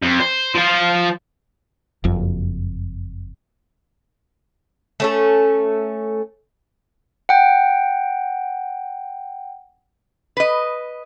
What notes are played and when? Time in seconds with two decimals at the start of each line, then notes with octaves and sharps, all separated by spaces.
0.02 F2
0.20 C5
0.55 F3 F4
2.04 F#1 F2
5.00 A3 C#4 A4
7.29 F#5 G5
10.37 B4 D#5